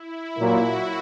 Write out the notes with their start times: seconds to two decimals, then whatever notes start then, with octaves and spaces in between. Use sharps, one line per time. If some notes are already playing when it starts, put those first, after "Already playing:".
Already playing: E4
0.39 A#2 F#3 A#3 F#4